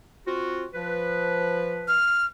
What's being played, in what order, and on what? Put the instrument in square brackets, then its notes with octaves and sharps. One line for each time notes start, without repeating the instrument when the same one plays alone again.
[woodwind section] C4 F4 F#4
F3 B4
[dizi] F6